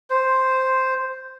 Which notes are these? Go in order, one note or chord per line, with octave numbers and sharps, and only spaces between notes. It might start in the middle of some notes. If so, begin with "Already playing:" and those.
C5